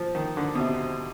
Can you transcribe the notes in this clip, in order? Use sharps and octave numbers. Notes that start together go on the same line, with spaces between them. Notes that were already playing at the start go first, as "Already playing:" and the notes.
Already playing: F3
D#3
D3
B2
C3